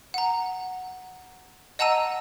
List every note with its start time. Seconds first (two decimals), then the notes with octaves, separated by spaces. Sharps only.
0.14 F#5 A#5
1.79 D#5 F#5 A5 A#5 E6 D#7